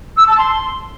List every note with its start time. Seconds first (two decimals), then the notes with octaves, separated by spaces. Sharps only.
0.16 E6
0.26 A5
0.37 C6